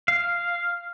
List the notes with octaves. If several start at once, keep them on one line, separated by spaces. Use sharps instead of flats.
F5